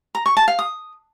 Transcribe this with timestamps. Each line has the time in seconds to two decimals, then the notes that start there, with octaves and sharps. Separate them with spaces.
0.15 A#5
0.26 C#6
0.37 A5
0.48 F5
0.59 D#6